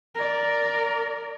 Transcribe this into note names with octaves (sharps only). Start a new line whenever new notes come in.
A#4 D5